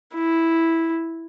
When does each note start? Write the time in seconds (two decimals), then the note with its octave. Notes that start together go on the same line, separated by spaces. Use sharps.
0.16 E4